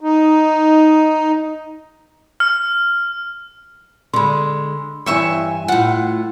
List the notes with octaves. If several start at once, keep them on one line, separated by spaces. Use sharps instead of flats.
D#4
F6
D3 G#3 B5 C6
G2 E3 C#5 E5 G#5 C#6
A2 F4 F#5